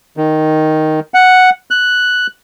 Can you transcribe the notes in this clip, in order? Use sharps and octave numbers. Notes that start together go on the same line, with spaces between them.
D#3
F#5
F#6